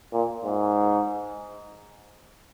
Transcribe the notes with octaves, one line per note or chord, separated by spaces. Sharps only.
A#2
G#2